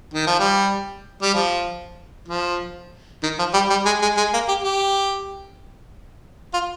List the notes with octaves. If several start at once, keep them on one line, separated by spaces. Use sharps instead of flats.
D#3
F3
G3
G3
F3
F3
D#3
F3
G3
G3
G#3
G#3
G#3
A#3
G4
G4
F4